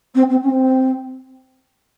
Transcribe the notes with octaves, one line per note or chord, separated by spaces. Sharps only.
C4
C4
C#4
C4